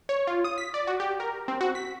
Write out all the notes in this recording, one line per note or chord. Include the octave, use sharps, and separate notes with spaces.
C#5
F4
D#6
B6
D5
F#4
G4
A#4
C4
F#4
B6